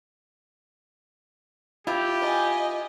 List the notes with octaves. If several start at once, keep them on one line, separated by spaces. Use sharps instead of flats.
E4 F4 G4
D#5 G#5